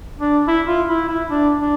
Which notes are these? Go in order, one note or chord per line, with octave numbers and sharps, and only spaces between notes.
D4
E4
F4
E4
E4
D4
D4